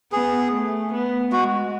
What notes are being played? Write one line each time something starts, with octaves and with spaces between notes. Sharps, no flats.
B3 G#4
A3
B3
G#3 F#4